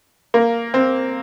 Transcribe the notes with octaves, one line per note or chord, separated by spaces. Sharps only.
A#3
C4